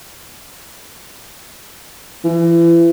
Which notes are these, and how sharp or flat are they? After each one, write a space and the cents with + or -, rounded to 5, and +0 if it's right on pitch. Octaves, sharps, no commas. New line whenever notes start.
E3 +35